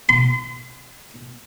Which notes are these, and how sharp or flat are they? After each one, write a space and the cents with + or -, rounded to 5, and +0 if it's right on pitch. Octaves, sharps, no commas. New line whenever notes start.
C6 -40